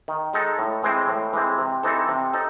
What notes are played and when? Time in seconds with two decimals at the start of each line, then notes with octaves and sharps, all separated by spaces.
0.08 D#3
0.33 G#3 D#4 A4
0.59 A2
0.83 E3 G#3 C4
1.08 A2
1.33 E3 G#3 C4
1.58 C3
1.83 E3 C4 D#4 A4
2.08 C3
2.34 D#4 A4